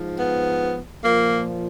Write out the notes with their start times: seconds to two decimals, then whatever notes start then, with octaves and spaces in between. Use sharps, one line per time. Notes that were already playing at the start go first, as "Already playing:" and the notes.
Already playing: G#2 F3
0.18 B3
1.03 A#2 F3 A#3